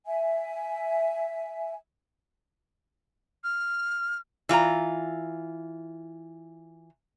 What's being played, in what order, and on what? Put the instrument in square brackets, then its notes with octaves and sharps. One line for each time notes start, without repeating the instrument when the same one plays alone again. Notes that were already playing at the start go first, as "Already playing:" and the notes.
[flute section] E5 G#5
[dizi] F6
[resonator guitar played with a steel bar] E3 F4 B4 A#5